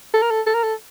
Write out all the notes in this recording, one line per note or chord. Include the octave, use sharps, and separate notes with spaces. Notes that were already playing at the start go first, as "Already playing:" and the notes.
A4
A#4
A4
A4
A#4
A4